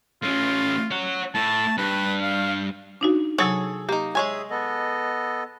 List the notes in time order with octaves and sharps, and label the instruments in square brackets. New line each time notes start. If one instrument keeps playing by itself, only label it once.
[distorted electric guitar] A2 C#4 [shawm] F4
[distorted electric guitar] C#5 F#5
[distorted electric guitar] A2 [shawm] A5
[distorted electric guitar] G2 [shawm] B4
[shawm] F5
[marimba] D4 D#4 F#4
[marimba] C3 F#3 G#6 [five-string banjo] G#4 A4 C#5
[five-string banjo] A#3 D#4 [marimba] G4
[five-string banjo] G#3 C#5 G#5 [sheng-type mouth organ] G#4 E5 D#6
[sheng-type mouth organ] B3 A4 D#5